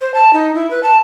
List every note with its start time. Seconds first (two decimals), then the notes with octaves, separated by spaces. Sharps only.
0.01 C5
0.14 A5
0.33 D#4
0.55 E4
0.70 B4
0.83 A5